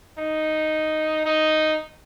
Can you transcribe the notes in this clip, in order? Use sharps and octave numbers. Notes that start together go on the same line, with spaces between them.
D#4
D#4